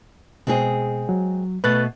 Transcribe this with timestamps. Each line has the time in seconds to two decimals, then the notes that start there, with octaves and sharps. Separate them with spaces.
0.47 B2 G#3 C4 G#4
1.09 F#3
1.64 B2 A3 B4 F#6 A6